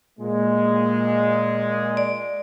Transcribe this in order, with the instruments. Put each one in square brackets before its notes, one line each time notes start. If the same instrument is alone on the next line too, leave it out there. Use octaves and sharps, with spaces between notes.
[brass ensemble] A#2 G#3
[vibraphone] D5